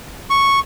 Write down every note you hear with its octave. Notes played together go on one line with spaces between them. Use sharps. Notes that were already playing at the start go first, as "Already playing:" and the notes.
C#6